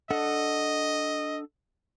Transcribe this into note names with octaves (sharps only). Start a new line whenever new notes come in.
D4 A4 D#5 F#5